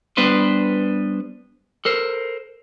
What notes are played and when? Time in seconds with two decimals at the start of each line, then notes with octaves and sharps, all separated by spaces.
0.17 G3 B3 D4 B4 C5
1.85 A4 A#4 C5